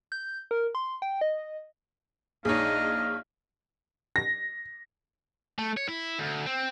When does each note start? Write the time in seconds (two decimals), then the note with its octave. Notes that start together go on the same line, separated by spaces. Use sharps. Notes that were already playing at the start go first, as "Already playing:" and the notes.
0.12 G6
0.51 A#4
0.75 C6
1.02 G5
1.21 D#5
2.45 A#1 D4 D#4 G#4 C#5 D#5 F5
4.16 A#6
5.59 A3
5.77 C#5
5.89 E4
6.19 D2
6.47 C4